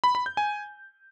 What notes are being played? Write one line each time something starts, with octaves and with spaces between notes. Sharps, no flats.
B5
B5
G6
G#5